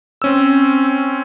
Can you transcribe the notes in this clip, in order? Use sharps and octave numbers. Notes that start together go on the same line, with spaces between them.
C4 C#4 E6